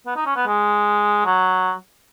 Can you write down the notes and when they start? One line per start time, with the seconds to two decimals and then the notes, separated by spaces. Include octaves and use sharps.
0.07 B3
0.16 D#4
0.26 C#4
0.36 B3
0.46 G#3
1.25 F#3